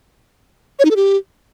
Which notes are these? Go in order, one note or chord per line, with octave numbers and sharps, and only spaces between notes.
C#5
D#4
A4
G4